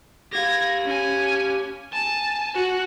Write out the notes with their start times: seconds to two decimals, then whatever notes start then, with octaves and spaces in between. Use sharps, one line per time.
0.33 G4 F5 G#6 A#6
0.85 C#4 G#5
1.93 G#5 A5
2.55 F#4